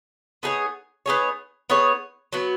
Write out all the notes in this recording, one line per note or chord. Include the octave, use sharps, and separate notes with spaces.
B3 D#4 G#4 C#5
B3 D#4 G#4 C#5
B3 D#4 G#4 C#5
F#3 B3 F#4